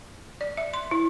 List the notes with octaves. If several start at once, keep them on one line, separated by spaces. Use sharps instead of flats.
D5
E5
C6
E4